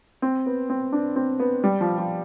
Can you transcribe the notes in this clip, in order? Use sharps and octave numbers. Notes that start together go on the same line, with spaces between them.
C4
B3
C4
D4
C4
B3
G3
F3
F3